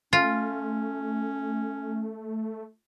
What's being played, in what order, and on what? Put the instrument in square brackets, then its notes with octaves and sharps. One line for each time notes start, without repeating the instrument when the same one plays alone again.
[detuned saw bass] A3 [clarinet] C#4 [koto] F4